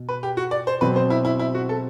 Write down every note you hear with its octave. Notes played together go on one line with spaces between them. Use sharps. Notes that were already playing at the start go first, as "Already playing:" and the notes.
Already playing: B2
B4
G4
F#4
D5
C5
B2 F#3 C4 B4
C5
E4
E4
E4
F#4
A4